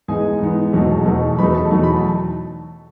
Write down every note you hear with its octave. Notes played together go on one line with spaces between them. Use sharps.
G#2 E3 B3 D#4 G#4 G#5
G#2 E3 B3 D#4
E2 B2 F#3 A3 D#4
E2 B2 F#3 A3 D#4
E2 B2 F#3 A3 D#4 B4 B5
A4 A5
E2 B2 F#3 A3 D#4
B5
A5